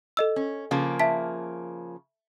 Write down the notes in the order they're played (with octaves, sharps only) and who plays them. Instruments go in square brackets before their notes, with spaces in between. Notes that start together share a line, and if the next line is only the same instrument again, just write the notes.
[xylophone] A4 D#5 E6
[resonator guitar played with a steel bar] C#4
C#3 F3 A#3
[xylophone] E5 A5 B6